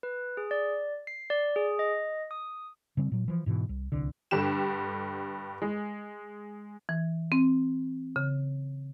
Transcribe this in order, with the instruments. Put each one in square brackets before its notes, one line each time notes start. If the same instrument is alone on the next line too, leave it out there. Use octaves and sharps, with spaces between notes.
[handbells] B4
G#4
D5
C7
D5
G#4
D#5
D#6
[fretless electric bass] C#3 G3 C4
A#2 F#3
E3 F3
G#2 B2 E3
C2
D1 C2 D3
[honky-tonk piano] G2 D3 G3 G4 E7
G#3
[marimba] E3
C4
C#3